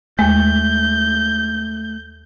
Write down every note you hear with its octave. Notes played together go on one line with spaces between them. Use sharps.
D#2 G#3 A3 G6